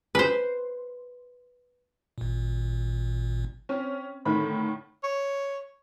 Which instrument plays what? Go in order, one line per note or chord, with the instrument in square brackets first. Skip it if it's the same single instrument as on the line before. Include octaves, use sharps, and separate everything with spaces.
[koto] B4 C5
[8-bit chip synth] G#1 A#2
[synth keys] C4 [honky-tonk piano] C#4
[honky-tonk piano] A2 D3 D#3 [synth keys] B5
[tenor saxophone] C#5